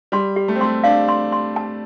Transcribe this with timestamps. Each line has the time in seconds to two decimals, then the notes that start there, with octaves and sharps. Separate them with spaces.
0.12 G3 C6
0.36 G4
0.48 A3
0.56 C4
0.61 A3 C6
0.84 D4 F5
1.08 C6
1.32 C6
1.56 A5